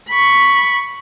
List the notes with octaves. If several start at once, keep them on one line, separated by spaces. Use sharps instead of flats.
B5 C#6